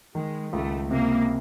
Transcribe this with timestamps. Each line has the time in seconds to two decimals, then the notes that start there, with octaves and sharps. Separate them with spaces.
0.15 D#3 G#3
0.52 C#2 A3
0.91 C3 A#3